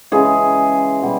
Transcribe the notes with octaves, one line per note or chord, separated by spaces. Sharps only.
C#3 E3 G#3 G#4
B2 G3